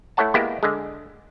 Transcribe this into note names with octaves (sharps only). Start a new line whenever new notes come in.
A3 E4 A4 C#5 F#5 A5
G#3 A#3 B3 E4 G4
D3 G#3